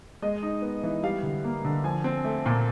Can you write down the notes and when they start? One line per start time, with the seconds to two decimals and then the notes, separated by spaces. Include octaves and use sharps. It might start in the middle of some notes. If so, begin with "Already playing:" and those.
0.22 G#3 D#5
0.43 D#4
0.62 B3
0.83 E3
1.03 G3 F5
1.23 D3
1.44 A#3
1.65 D3
1.84 F3 G#5
2.04 C4
2.25 A3
2.46 A#2